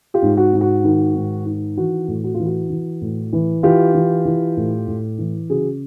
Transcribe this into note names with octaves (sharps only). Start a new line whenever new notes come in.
F4 G4
G#2
F#4
G#2
F#4
D#3
G#2
D#3
E3 F#4
A2
F#4
E3 F4
F#4
E3
A2
E3
E3 F4 G4
E3
E3
A2
A2
E3
C#3 F#4 G#4